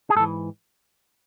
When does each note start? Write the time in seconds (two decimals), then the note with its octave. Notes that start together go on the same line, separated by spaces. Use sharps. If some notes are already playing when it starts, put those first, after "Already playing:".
0.10 G#4
0.15 G#2 A4
0.20 E3